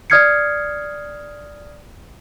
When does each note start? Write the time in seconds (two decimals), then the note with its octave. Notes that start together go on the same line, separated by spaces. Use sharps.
0.10 D5 D#6 F6 G#6 C7 C#7